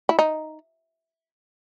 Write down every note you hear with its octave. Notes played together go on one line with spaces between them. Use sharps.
E4
D#4